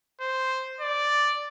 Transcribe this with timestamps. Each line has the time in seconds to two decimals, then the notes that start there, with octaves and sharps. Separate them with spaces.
0.21 C5
0.81 D5